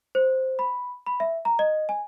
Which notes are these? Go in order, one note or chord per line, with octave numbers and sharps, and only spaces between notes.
C5
B5
B5
E5
A#5
D#5
G#5